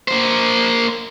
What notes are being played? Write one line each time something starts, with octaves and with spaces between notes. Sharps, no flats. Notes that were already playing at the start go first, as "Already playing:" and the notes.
A#3 C5